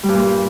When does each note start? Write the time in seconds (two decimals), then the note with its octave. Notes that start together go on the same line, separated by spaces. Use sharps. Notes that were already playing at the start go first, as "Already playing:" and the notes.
0.03 G3
0.08 G2
0.14 A#2